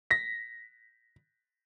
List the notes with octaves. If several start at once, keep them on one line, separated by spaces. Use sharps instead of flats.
A#6 B6